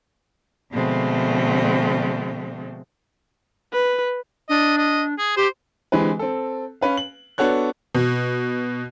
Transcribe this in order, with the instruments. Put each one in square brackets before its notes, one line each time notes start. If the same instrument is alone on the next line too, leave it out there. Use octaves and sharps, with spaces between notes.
[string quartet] B2 D3 F3 G#3 A3 C4
[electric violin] B4
[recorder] D4 [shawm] D#5
[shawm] D#5
G#4
[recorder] G4 [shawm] C5
[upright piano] D3 E3 G#3 C4 G4 B4
C4 A4
C#4 B4 F5
F#7
B3 D4 F#4 A4 C#5 F#6
[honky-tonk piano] B2